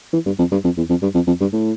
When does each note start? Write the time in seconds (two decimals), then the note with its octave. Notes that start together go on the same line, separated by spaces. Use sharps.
0.13 E3
0.26 G2
0.39 F2
0.52 G2
0.64 F2
0.77 E2
0.89 F2
1.02 G2
1.15 F2
1.27 F2
1.41 G2
1.53 A2